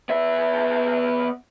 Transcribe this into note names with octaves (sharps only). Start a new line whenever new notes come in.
B3 E5